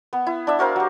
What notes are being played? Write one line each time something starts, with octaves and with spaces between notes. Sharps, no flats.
B3
E4
D4 D5 E5
F#4 A#4 C5 F5
F#3 G4